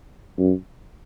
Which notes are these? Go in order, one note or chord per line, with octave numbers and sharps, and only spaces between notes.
F#2